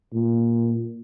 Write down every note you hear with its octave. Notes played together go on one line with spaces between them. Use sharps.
A#2